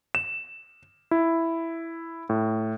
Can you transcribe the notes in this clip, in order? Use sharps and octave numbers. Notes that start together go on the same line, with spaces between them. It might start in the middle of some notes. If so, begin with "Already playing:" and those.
E7
E4
A2